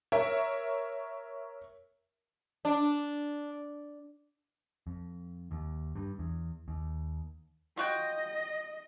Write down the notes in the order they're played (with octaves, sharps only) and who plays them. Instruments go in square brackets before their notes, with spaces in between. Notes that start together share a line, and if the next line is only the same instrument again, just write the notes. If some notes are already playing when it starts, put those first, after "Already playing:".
[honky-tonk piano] A#4 C#5 E5
[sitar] D4
[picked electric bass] F2
D#2
G2
E2
D#2
[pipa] F4 F#4 G5 [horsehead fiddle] D#5